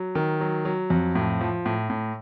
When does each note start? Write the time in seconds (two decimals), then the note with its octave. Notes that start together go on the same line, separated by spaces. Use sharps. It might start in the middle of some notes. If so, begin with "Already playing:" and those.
Already playing: F#3
0.15 D#3
0.41 F#3
0.65 F#3
0.90 F2
1.15 A2
1.41 F3
1.65 A2
1.90 A2